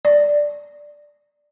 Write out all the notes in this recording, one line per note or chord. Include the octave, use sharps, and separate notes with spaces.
D5